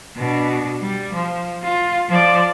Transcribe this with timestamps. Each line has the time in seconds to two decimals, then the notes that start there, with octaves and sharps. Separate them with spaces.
0.16 B2 D4
0.81 G3
1.13 F3
1.62 F4
2.09 F3 D5